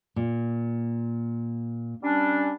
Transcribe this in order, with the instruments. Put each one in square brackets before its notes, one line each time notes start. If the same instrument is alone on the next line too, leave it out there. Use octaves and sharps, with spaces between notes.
[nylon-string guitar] A#2
[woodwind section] G3 C#4 D4